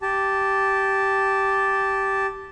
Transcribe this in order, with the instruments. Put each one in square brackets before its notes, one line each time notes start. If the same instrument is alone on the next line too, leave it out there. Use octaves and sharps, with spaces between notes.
[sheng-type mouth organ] G4 A5